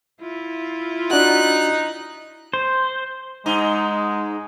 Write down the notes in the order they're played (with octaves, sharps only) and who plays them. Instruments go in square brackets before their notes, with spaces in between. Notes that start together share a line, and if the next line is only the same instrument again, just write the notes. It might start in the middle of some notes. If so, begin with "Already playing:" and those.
[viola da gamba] E4 F4
[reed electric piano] D4 F#4 [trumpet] D#4 [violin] F#6
[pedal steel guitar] C5
[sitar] G#2 D#4 [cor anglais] G#3